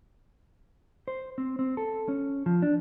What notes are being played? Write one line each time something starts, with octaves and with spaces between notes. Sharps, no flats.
C5
C4
C4
A4
C#4
F3
D4